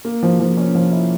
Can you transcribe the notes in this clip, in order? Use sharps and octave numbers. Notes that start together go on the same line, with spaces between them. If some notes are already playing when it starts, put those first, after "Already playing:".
A#3
F3
F3
C#4
F3
E4